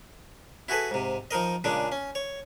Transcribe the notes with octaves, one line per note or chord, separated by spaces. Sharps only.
E4 F#4 G#4 A4 B4
G#2 C3
F3 D#4 A#4 D#5
A#2 C#3 G#3 D4
C#4
C#5